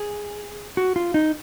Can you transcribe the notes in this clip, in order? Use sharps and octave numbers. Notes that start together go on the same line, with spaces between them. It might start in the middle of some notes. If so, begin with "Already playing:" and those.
Already playing: G#4
F#4
F4
D#4